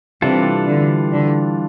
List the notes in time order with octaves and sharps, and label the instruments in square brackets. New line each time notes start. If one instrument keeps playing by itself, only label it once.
[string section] C3 [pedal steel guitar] E3 G3 D4 F4 A4
[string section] D3
D3